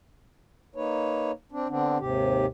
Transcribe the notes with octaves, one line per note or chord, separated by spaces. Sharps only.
A#3 D#4 B4 C#5
C4 D4
D3 B3 C4 D4
D#2 G#2 C3 G4